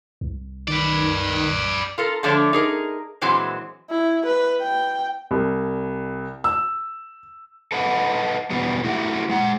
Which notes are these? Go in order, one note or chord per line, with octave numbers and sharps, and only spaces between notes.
C2
D#3 B4 D5
F4 A4 A#4
D3 F3 A3 D4 A4 C#5
D#4 G#4 A#4
A#2 E3 F#3 G#3 C4
E4
B4
G5
C2
E6
A4 B4 D#5 F#5
E2 B2 G3 B3
A3 E4 F#4 G4
G#3 F#5